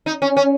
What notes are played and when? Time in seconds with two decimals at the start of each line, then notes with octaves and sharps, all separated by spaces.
0.06 D#4
0.22 C#4
0.37 C#4